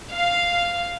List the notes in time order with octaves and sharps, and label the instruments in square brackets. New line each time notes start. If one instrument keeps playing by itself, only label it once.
[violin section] F5